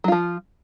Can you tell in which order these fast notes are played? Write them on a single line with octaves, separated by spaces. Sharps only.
F#3 F4 F3